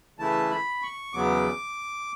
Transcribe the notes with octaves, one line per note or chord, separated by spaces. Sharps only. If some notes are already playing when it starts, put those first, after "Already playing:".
C#3 E3 A3 E4 A5
B5
C#6
E2 C#3 F#3 B3 D6